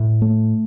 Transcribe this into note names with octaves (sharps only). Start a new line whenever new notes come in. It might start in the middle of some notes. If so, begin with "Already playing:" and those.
Already playing: A2
A3